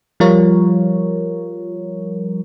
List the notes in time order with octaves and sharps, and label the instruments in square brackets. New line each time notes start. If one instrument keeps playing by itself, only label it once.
[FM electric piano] F3 G3 F4 A#4 C#5